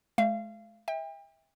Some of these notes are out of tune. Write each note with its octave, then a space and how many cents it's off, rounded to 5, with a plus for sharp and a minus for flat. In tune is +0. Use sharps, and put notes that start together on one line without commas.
G#3 +45 F5 -30
E5 -25 G5 +35